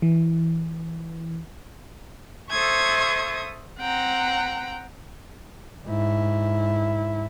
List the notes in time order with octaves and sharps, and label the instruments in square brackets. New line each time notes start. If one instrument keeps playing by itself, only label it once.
[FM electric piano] E3
[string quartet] A4 C5 E5 C#6 D#6 G#6
C4 F#5 G5 A#5
[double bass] G#2 E4